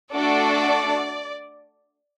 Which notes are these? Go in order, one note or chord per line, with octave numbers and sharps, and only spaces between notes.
A3 D4 F#4 A4 D5